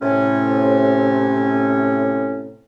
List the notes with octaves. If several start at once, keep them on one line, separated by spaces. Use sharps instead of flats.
A2 C3 C#4